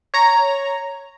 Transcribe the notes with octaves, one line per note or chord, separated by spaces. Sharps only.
C#5 A#5